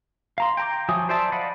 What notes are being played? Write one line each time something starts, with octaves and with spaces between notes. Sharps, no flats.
F5 A#5 C6
G5 A#5 D6
F3 F#3 E5 G#5 D#6
C5 D5 E5 A5
D5 D#5 F5 F#5 B5